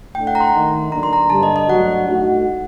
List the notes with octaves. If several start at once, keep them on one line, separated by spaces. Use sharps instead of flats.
A2 A3 D4 G5
F#5
A#5
C6
D#3 A3 D#4
D3 F#3 A#3 D4 A#5
C6
A#5
G2 D3 G3 A5
D#5
D#5
G2 F#3 A3 D4 F#4 F#5
A2 A3 D#4 F#4